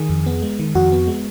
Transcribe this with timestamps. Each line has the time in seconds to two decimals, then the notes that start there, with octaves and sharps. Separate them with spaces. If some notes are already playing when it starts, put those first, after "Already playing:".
Already playing: D#3 G#4
0.09 F2
0.26 B3
0.42 G#3
0.59 D#3
0.75 F2 F#4
0.92 B3
1.07 G#3